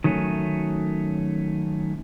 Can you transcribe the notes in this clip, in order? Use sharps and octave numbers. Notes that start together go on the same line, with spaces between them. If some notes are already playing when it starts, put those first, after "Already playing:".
D#3 F#3 A3 C#4